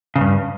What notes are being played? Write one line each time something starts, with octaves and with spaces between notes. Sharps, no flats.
E2 G2 C#3